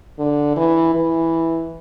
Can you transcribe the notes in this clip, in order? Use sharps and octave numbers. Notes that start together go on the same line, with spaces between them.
D3
E3
E3